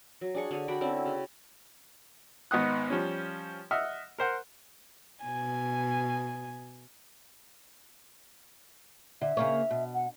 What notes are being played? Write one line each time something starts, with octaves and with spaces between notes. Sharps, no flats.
F#3
D4 G#4 C#6
D3 G#4 C#5
D4 F#4 G5 B5
D3 C4 C#4 E4
C#3
G#1 B3 D#4 F#5 D#6 F#6
F3 G3 C#4
D#5 E5 F#5 F6
A#4 C5 F#5
B2 G#5
D3 E5
C#3 A#3 C#5
B2
F#5